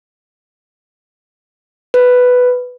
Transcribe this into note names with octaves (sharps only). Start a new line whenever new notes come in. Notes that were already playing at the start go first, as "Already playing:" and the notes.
B4